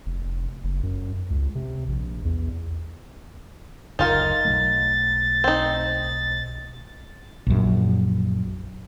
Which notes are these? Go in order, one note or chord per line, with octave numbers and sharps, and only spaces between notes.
F1
F#1
F#2
C#2
C3
A#1
E2
F#1 D2 D#4 F4 A#4 A6
B1 F#3 A3
C4 D#4
A#1 F#2